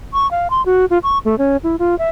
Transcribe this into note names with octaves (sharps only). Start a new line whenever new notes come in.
C#6
F5
C6
F#4
F4
C#6
A3
C#4
E4
F4
E5